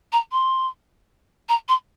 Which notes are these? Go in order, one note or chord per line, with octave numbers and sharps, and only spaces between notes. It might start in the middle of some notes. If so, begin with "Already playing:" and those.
A#5
C6
A#5
C6